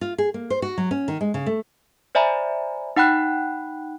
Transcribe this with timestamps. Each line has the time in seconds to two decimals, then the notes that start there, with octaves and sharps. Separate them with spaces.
0.01 F4
0.18 G#4
0.34 A#3
0.50 C5
0.62 F#4
0.78 F#3
0.91 C#4
1.08 D#3
1.21 G#3
1.34 C#3
1.46 A3
2.15 C5 D5 E5 G#5 A#5 B5
2.96 D#4 F#5 G5 B5 F#6